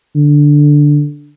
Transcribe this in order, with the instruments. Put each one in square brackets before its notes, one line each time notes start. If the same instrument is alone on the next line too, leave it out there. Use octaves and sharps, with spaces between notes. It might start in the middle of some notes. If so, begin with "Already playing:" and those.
[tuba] D3